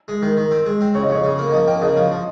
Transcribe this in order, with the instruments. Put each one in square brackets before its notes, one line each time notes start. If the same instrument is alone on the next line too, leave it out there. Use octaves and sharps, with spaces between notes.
[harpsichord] G#3
D#3
D#3
C4
G#3
C4
[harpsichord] C#3 [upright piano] C#5
[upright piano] D#5
[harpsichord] F2 [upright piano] C#5
[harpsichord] C#3
A#3
[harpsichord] F3 [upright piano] D#5
[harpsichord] A#3 [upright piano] G5
[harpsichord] C#3 [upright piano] D#5
[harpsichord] F3 [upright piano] F5
[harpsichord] F3